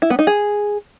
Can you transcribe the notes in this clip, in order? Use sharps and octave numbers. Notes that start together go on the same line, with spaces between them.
E4
B3
D#4
G#4